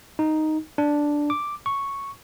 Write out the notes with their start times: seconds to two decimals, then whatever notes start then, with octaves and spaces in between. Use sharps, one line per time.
0.19 D#4
0.78 D4
1.30 D6
1.66 C#6